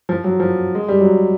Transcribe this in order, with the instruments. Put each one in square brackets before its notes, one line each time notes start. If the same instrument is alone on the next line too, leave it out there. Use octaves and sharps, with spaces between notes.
[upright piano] F3
F#3
F3
G#3
G3
F#3